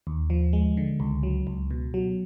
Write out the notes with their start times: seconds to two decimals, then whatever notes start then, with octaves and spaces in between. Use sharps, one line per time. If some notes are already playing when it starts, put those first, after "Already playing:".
0.07 D#2
0.30 F3
0.53 G#3
0.77 D3
1.00 C#2
1.23 F#3
1.47 C#2
1.71 B2
1.94 F#3